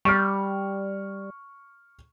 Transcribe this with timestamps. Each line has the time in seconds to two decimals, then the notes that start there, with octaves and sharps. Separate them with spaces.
0.05 G3 C#6 F6